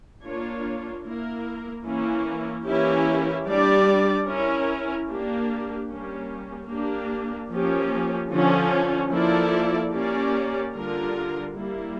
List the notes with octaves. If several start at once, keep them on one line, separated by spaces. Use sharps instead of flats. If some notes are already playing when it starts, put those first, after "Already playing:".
A#3 D4 F4 C#5
A#3 E4 A#4
E3 A#3 C#4 E4
E3 A#3 C#4 E4 G4
G3 D4 G4 D5
C#4 E4 A#4
A#3 D4 G4
G3 A#3 C#4 G4
A#3 D4 G4
F3 A#3 C#4 G4
D3 F3 C#4
F3 A#3 E4 A4 D5
A#3 C#4 G4 D5
D3 G3 D4 F4 A#4
G3 A#3 E4